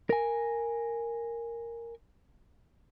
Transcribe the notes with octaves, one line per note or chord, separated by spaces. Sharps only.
A#4 G#5